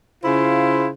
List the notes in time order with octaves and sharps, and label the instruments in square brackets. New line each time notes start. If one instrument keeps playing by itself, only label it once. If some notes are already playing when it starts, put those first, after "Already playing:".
[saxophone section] C#3 E4 F4 C5